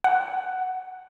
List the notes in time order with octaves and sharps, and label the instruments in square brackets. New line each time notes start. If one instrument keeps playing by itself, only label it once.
[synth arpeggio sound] F#5